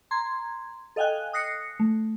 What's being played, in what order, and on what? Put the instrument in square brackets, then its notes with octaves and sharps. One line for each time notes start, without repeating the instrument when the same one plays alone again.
[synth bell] A#5 C6 G#6
A4 D#5 F5 G5 G#5 F#6
D#6 F#6 A#6 C7 C#7
A3